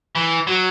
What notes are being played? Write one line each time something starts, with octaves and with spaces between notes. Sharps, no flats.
E3
F#3